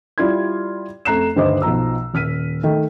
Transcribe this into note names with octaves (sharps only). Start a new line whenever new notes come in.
G3 E4 F4 D5 C6 G#6
F2 A3 A#5 F#6 C7 E7
D2 G2 D#3 C5 D#5 D6
B1 F3 A#5 E6
D#1 F6 B6 D#7
D#3 A3